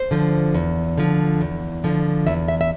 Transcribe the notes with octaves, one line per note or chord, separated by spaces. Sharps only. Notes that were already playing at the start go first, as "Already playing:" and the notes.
Already playing: C5
D3 F3
E2
D3 F3
E2
D3 F3
E2 E5
E5
E5